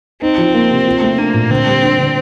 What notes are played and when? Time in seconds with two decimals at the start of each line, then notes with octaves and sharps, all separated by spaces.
0.22 C4 D#4
0.38 F3
0.54 A#3
0.70 C3
0.87 F4
1.02 A3
1.18 A#3 D4
1.34 A#2
1.50 D3 C4
1.66 G3
1.82 D4
1.98 D3